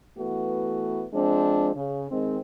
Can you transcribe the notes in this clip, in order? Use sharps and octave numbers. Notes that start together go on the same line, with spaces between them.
E3 A3 B3 F#4
F3 G#3 C4 D4
C#3
D#3 G#3 C4